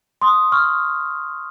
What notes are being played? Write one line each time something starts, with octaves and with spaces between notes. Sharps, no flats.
C6 D#6
C#6 F6